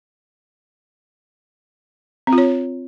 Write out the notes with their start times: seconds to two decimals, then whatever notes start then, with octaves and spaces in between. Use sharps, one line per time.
2.27 C4
2.33 F4
2.38 C#5